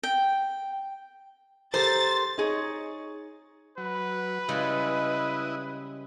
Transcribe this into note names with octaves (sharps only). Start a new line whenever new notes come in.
G5
G4 A4 A#4 C5 A6
D#4 G#4 C#5
F#3 B4
C#3 G3 G#3 E4 D#5